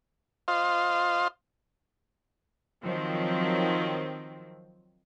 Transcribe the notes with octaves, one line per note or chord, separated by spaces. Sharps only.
F4 C5 D#5 F5 C6
D#3 F3 F#3 C4